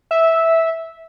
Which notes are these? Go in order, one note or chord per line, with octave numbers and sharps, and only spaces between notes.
E5